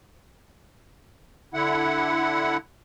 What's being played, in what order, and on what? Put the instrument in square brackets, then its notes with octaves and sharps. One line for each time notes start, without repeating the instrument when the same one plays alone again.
[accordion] D3 E4 F#5